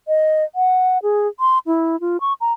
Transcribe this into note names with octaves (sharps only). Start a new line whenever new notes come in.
D#5
F#5
G#4
C6
E4
F4
C#6
A#5